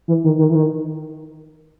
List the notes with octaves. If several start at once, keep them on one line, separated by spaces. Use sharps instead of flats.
E3
D#3
D#3
E3
D#3